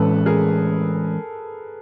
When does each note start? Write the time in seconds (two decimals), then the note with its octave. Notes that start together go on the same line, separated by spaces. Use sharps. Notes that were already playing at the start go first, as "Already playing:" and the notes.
Already playing: A2 E3 G#3 C#4 A4 B4
0.26 G#4 A#4